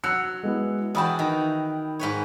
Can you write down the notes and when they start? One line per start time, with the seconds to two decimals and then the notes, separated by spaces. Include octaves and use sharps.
0.04 F#3 E6 F#6 C#7
0.43 G#3 B3 E4
0.95 E2 F#4 G5 A5 B5 D#6
1.19 D#3
1.99 G#2 B4 C#5